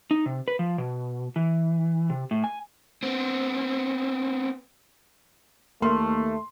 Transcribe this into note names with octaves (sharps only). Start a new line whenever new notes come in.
D#4
C3
B4
F3
B2
E3
C3
A2
G#5
B3 C4
D#2 A3 A#3 C6